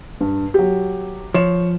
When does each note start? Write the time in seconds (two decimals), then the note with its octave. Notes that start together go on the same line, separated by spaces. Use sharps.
0.21 G2
0.54 F#3 G4
1.34 F3 C#5 E7